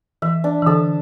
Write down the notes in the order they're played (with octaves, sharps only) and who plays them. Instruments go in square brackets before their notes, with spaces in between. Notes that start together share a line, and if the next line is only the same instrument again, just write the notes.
[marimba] E3 [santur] E5
[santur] D4
[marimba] E3
[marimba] D3 [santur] A4